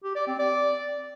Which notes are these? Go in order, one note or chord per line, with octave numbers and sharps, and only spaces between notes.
G4
D5
C4
D5